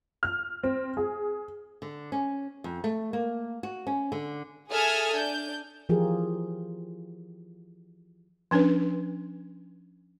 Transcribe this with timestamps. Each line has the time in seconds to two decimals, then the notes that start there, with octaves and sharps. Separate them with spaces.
0.23 F6
0.63 C4
0.97 G#4
1.82 D3
2.12 C#4
2.64 F2
2.84 A3
3.13 A#3
3.63 F#4
3.87 C#4
4.12 D3
4.70 G#4 A4 E5 G#5 D#6 F6
5.15 D4 G6
5.89 E3 F3 F4 G4 G#4 A#4
8.51 F3 C#4 D4 B4 C#5